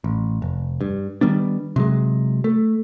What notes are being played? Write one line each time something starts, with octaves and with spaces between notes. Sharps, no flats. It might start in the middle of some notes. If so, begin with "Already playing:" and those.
A1
F1
G2
D#3 G3 B3 D4
C3 F#3 G#3
A3